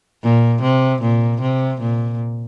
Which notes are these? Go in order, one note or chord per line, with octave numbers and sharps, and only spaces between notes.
A#2
C3
A#2
C3
A#2